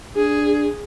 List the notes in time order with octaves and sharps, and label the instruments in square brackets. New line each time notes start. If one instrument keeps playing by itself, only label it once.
[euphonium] D4 [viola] G#4